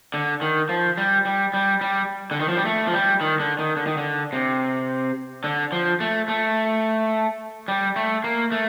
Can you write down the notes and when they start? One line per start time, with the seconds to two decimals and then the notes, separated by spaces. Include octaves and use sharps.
0.14 D3
0.42 D#3
0.69 F3
0.98 G3
1.25 G3
1.54 G3
1.81 G3
2.31 D3
2.40 D#3
2.48 F3
2.57 G3
2.65 A3
2.87 F3
2.93 G3
3.21 D#3
3.40 D3
3.59 D#3
3.77 D3
3.87 D#3
3.97 D3
4.33 C3
5.44 D3
5.72 F3
6.00 A3
6.28 A3
7.68 G3
7.96 A3
8.24 A#3
8.52 A3